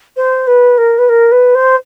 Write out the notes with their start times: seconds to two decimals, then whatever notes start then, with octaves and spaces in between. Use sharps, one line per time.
0.17 C5
0.47 B4
0.78 A#4
0.98 B4
1.09 A#4
1.32 B4
1.55 C5